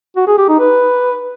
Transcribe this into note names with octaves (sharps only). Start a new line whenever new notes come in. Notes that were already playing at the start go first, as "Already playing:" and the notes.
F#4
G#4
G4
D#4
B4